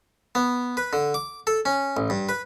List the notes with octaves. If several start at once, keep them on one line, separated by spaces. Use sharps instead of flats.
B3
B4
D3
D6
A4
C#4
A1
G2
B4